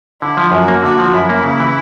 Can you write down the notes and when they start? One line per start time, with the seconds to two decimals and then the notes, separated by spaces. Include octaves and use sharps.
0.22 D3 E4
0.37 F3
0.52 F#2 F#4
0.68 A#3
0.83 D3 F#4
0.99 F3
1.13 F#2 E4
1.29 A#3
1.44 C#3
1.60 E3